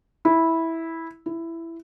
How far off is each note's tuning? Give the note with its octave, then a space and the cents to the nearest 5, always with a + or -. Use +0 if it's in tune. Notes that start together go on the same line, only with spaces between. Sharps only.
E4 -10
E4 +10